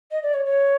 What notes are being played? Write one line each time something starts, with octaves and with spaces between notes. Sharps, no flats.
D#5
D5
C#5
C#5